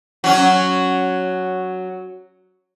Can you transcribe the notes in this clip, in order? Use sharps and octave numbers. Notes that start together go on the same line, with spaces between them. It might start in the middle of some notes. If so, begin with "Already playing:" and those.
F#3 C#4